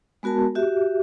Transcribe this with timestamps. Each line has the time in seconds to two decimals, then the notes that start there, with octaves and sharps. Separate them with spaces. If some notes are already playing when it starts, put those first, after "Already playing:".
0.23 G#3 B3 F#4 A#4 A5
0.55 F#4 G4 E5